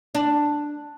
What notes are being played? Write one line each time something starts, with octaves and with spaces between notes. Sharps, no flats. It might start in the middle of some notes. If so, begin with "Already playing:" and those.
D4